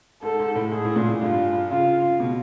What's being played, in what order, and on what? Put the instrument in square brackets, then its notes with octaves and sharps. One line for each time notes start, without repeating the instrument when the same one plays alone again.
[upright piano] G#2 [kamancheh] A4
[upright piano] G#2
A2
[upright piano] G#2 [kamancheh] G#4
[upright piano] A2
A#2
A2
[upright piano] G2 [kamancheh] F4
[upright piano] C#3 [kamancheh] F4
[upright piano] B2